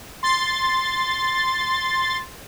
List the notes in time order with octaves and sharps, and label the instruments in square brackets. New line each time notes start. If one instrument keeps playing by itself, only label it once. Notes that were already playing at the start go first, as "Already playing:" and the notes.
[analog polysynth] C6 A6